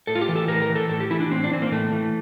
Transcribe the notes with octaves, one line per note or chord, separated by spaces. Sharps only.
A2 A4
F4
G4
E3
A4
A2 A#4
A#4
E3
A4
A2 A4
G4
E3 E4
D4
A2 C4
D4
E3 C4
A#3
A2 A3
E3